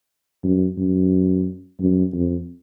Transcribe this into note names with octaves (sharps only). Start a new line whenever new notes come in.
F#2
F#2
F#2
F2